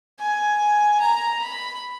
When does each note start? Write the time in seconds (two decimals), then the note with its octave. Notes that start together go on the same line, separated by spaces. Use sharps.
0.19 G#5
1.00 A#5
1.41 B5